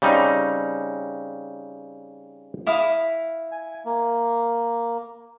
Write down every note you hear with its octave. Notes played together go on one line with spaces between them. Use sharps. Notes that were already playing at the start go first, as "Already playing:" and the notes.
C#3 G3 C4 D#4
E4 F5 D#6
G#5
A#3